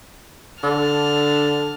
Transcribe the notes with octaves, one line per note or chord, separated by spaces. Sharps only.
D3 A5 F6